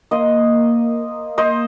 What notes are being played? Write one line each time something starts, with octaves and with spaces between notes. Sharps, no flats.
A#3 C5 D#5
C5 D#5